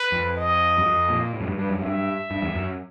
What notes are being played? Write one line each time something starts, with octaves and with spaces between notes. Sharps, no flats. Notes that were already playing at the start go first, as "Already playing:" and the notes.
Already playing: B4
F2
D#5
F#2
F2
A#2
A2
F#2
G2
G2
F#2
G2 E5
G2
E2
F#2